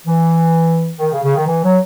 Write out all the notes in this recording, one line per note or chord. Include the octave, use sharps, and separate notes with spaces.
E3
D#3
C#3
C#3
D#3
E3
F#3